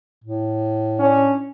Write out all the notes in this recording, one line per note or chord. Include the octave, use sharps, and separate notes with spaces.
A2
C#4 D4